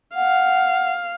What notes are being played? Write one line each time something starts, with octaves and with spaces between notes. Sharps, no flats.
F5 F#5